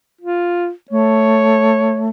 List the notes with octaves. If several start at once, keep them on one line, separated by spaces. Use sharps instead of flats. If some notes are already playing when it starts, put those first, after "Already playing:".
F4
A3 C#5